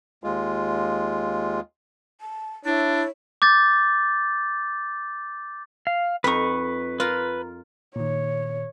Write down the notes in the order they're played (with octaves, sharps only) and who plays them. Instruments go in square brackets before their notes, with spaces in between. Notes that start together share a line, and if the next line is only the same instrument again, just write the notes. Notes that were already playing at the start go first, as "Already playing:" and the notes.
[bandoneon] D#2 G#3 F4
[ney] A5
[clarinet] D4 [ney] E4 [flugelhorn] C#5
[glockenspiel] D6 G6 A6
[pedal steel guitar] F5
[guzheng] F2 D#4 [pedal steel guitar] B4 C#6
[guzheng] F4 A#4 [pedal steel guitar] B4
[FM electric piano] A#2 D#3 [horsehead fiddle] C#5